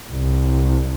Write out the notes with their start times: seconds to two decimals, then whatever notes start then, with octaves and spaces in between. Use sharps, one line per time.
0.11 C2